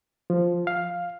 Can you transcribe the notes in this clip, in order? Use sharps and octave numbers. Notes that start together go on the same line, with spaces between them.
F3
F5